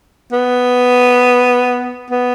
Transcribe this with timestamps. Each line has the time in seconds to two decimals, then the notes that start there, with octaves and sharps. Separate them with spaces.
0.32 B3
2.11 B3